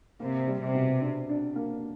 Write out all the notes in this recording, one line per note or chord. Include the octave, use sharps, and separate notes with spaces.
C3 A#3
G3
C3
B2
D4
D4
A#3